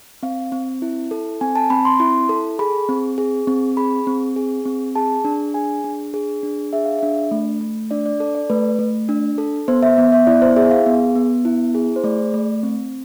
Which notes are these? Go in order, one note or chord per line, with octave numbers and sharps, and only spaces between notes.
C4 F5
C4
E4
A4
C4 G#5
A5
C4 B5
C6
E4 C6
A4
G#4 B5
C4
G#4
C4
G#4 B5
C4
G#4
C4
G#4 A5
D4
G#4 G#5
D4
G#4
D4
G#4 E5
F5
D4 E5
A3
A3
D4 D5
D5
A4 D5
D5
A3 B4
A3
D4
A4
B3 C5
E5
B3
E5
E4 D5
C5
G#4 E5
F5
B3
B3
E4
G#4
C5
A3 D5
A3
C4